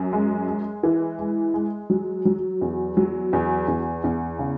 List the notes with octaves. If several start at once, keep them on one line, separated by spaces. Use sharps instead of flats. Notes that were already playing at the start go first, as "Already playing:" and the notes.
Already playing: F#2
G#3
G#3
E3
G#3
G#3
F#3
F#3
E2
F#3
E2
E2
E2
C#3